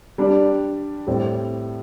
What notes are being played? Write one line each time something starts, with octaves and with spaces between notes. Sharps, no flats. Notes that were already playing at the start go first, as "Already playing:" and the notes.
G3 D4 G4 D5
A2 G3 C4